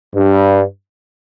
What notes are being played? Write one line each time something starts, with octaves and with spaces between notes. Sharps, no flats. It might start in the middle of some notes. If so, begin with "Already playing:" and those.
G2